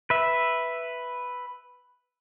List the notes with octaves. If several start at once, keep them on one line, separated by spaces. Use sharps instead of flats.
B4 E5